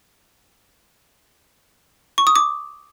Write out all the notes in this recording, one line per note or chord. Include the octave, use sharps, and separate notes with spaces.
C#6
D#6
D6